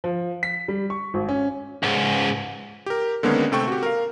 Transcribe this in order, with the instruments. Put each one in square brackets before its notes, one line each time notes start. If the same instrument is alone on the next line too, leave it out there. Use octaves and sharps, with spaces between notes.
[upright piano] F3
B6
G3
C#6
G#1
C#4
[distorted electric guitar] C#2 G#2
[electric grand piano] G4 A#4
D3 D#3 G#3 A#3 B3 C#4
C3 A3 C4 A4 G5 C#6
F#4 G4
A#4 F5